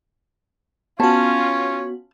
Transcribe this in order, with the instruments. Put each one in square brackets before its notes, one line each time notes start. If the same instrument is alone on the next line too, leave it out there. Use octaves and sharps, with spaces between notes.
[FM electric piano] B3 F#4 [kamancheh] C#4 F4 [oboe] C#5 [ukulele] A5